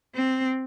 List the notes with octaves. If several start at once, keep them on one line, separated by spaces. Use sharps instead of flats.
C4